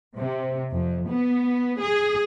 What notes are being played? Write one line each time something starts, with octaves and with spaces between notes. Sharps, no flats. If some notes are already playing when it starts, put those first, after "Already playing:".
C3
F2
B3
G#4